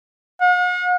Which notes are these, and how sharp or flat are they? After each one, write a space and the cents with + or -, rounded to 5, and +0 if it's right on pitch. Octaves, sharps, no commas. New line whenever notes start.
F#5 -45